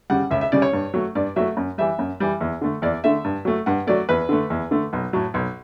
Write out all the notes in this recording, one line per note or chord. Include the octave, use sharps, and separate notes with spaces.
C#3 G3 F#5
C#2 E5
E5
C#3 G3 D5
C#5
G2
F#3 A3
G2 D5
F#3 A3 E5
F#2
E3 G3 E5
F#2
E3 G3
E2
D3 A3
E2 D5
D3 A3 E5
G2
F#3 A3
G2 F#5
F#3 A3 D5
E2 B4
D3 A3
E2
D3 A3
B1
A2 F#3
B1